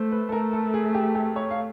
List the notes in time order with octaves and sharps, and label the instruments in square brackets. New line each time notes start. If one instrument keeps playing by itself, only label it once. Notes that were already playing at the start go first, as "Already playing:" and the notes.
Already playing: [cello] A3 [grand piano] C5
[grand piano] B4
A4
[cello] A3 [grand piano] A#4
[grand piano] A4
G#4
G4
G4
C#5
F5